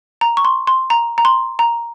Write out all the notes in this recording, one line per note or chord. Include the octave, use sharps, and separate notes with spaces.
A#5
C#6
C6
C6
A#5
A#5
C6
A#5